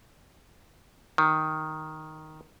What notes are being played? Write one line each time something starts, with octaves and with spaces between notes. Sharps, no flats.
D#3